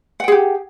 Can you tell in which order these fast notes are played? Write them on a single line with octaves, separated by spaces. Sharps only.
F#5 G5 G#4 G4